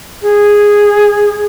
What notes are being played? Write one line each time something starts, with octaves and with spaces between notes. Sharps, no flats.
G#4